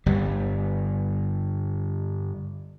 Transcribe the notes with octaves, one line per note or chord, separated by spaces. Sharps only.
G1 G3